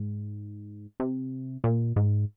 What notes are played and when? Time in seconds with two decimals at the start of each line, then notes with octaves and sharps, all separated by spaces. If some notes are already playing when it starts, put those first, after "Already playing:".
Already playing: G#2
1.00 C3
1.64 A#2
1.96 G#2